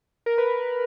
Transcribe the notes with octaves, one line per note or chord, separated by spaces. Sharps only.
A#4
B4